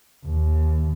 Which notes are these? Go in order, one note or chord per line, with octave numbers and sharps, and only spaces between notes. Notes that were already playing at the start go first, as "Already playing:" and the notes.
D#2